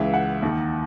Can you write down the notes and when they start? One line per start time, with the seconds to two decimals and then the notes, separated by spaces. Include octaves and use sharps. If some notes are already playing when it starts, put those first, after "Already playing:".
Already playing: C#2 C#3 E3 E5
0.14 F#5
0.42 D#2 D#3